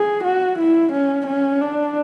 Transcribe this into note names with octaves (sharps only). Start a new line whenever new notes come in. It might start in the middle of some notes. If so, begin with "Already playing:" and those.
Already playing: G#4
F#4
E4
C#4
C#4
D4